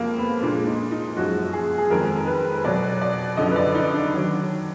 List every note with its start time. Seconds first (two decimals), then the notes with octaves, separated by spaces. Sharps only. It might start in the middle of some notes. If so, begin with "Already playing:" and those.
Already playing: F2 F3 G#3 A#3
0.18 B3
0.42 A#2 D4
0.46 G#3
0.67 D#4
0.91 D#4
1.17 F#2 F3 G#3 F#4
1.53 G#4
1.78 G#4
1.90 F2 D#3 G#3 A#4
2.27 B4
2.64 B2 F#3 D5
3.01 D5
3.37 F#2 D3 F3 D#5
3.51 B4
3.56 D5
3.75 D#4
3.93 D4
4.13 D#3 F#3